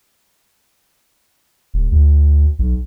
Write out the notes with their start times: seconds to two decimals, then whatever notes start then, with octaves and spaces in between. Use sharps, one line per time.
1.74 D#1
1.92 D2
2.59 B1